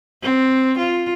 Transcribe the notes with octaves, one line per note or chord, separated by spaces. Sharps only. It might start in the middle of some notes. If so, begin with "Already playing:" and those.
C4
F4